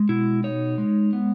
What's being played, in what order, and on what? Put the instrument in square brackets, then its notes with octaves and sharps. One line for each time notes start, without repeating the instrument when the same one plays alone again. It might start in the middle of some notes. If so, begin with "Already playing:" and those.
Already playing: [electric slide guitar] G#3
B2 E4
D#4 C#5
G#3
B3